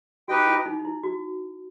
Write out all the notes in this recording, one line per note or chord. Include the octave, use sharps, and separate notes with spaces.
D#4 F#4 G4 B4 D#5 G5
E4
D#4
D#4
E4
F#4